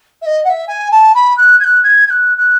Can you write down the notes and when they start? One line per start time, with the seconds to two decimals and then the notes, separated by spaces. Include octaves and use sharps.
0.22 E5
0.26 D#5
0.44 F#5
0.49 E5
0.67 G#5
0.91 A5
1.14 B5
1.37 F#6
1.60 G#6
1.64 F#6
1.83 G#6
2.07 G#6
2.10 F#6
2.37 F#6